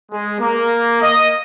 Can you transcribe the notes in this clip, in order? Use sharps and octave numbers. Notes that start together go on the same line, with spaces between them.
G#3
A#3
D#5